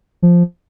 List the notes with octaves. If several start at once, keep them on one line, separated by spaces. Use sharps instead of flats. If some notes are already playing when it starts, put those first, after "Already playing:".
F3